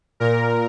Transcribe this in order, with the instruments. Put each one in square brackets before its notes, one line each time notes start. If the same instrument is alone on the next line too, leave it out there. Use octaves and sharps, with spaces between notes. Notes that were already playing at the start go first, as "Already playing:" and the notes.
[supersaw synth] A#2 A#4